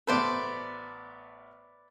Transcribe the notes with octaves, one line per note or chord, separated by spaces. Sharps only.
A1 B3 A4 B4 C5 D5